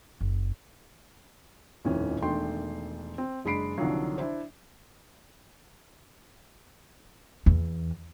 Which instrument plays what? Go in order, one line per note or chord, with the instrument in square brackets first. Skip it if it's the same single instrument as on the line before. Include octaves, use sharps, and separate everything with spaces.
[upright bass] F#1
[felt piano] D#1 F2 A2 D#3 C#4 G#5
E1 D#3 A3 D4 G5 C6
C4
F#1 G#3 D4 B5 C7 D7
C2 D3 D#3 F3 F#3
D4 E4 C5
[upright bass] E2